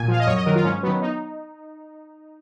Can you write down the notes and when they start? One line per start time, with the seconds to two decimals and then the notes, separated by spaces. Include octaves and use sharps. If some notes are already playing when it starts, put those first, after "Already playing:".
Already playing: A#2 G#5
0.08 F3 F5
0.20 D#5
0.27 F#2 C#5
0.36 D#5
0.46 D#3 F#3 A#4
0.56 F4
0.64 G#2 C#4
0.83 D#3 F#3 B3
1.02 D#4